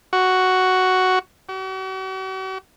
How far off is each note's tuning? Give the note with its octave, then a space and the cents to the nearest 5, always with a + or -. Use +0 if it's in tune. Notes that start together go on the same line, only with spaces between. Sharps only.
F#4 +5
F#4 +45